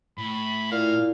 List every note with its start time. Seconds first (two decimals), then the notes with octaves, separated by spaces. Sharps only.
0.18 A2 B5
0.71 A#2 E4 F5